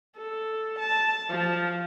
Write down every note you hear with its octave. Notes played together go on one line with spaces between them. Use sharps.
A4
A5
F3